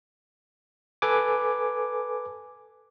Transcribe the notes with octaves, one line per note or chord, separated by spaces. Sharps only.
A4 B4 G#5 D6